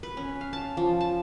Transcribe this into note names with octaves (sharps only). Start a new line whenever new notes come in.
B4
C#4
F5
A5
F3
A5